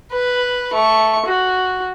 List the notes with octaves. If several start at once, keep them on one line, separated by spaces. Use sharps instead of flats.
B4
A3 C#6
F#4